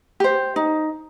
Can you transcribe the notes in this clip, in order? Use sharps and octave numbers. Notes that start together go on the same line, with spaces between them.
G4 C5
D#4